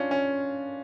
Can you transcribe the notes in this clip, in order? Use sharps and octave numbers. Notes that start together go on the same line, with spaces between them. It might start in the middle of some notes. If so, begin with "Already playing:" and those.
Already playing: C#4 D4 F4
C#4